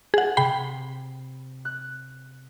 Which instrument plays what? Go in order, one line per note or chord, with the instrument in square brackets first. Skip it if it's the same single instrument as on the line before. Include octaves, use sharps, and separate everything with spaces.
[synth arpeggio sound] G#4 F#5
[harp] C3 [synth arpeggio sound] G5 B5 C7
[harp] F#6